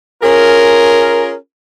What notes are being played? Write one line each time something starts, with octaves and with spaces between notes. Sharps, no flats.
C#4 F4 G#4 A#4